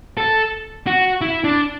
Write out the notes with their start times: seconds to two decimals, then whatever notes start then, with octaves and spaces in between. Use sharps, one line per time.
0.17 A4
0.87 F#4
1.21 E4
1.44 D4